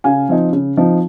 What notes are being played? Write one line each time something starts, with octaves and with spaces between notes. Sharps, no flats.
C#3 F5 G#5
F3 C4 D#4
C#3
F3 C4 D#4